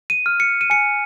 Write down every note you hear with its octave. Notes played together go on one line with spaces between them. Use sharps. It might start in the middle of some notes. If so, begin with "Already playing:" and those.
D#7
F6
C#7
D#7
G#5 C#7